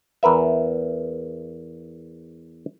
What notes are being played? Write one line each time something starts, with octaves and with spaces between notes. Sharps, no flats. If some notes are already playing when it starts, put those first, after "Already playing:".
E2 A#4 B4 E5